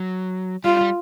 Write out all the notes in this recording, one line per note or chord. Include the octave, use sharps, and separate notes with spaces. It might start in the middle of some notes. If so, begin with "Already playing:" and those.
Already playing: F#3
G3 F4
G3